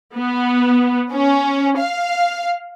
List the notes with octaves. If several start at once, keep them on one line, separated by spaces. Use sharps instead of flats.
B3
C#4
F5